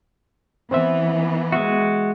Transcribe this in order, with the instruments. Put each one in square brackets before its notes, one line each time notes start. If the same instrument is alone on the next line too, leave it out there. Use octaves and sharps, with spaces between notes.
[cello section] E3 B3 [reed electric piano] C4 C5 E5
[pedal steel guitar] G#3 F#4 [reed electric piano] E5